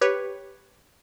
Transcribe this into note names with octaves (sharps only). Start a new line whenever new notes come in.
G4 B4 C#5